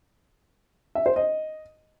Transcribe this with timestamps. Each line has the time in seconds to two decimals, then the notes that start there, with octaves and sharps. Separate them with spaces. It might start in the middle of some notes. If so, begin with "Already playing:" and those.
0.95 E5
1.06 C5
1.16 D#5